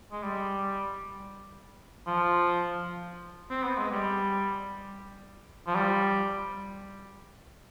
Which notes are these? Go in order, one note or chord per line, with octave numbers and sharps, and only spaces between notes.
G#3
G3
F3
C4
B3
G#3
G3
F3
G3